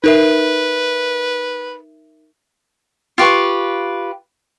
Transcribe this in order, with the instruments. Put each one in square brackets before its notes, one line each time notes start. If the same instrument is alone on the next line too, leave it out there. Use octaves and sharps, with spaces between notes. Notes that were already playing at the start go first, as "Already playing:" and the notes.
[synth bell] D#4 A#4 E5 [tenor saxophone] B4
[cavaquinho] F4 G4 B4 C#6